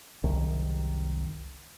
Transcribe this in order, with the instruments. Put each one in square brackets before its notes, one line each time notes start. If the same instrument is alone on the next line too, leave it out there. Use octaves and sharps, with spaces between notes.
[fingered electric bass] F#1 C2 D#3